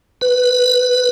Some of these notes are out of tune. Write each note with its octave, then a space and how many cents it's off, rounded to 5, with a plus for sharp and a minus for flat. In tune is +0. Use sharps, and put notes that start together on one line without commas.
B4 +10